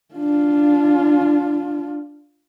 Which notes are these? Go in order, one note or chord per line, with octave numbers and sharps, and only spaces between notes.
D4 F4